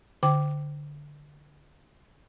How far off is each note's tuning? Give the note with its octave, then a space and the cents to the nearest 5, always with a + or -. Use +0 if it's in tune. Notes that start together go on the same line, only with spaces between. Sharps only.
D3 +0 G5 -10 D6 +0